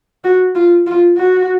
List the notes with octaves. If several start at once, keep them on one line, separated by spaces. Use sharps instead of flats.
F#4
F4
F4
F#4